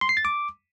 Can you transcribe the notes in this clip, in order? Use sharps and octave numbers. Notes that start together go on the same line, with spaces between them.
C6
C7
A6
D6